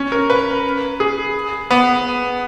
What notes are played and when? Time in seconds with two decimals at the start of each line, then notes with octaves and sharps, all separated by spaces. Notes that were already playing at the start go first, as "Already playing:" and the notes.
Already playing: C#4
0.12 A#4
0.30 B4
1.00 G#4
1.70 B3